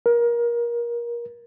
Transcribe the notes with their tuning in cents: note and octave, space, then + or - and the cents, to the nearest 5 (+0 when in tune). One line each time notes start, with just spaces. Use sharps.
A#4 +25